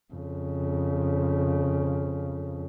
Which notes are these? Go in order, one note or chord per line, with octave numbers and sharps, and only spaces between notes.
F2 C#3